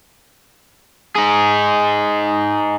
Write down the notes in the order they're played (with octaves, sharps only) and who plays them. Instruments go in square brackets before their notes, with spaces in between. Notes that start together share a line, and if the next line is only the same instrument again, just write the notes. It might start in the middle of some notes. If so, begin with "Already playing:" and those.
[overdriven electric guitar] D#4 G#4